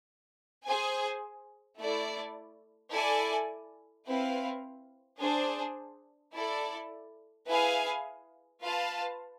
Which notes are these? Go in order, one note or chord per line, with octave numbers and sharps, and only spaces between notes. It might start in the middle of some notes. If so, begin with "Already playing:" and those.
G#4 C5 G#5
A3 E4 A4 D5
E4 A4 D5 G#5
C4 E4 B4 F5
D4 G#4 C5
E4 A4 D5
E4 G#4 B4 F5 G#5
F4 B4 F5 A5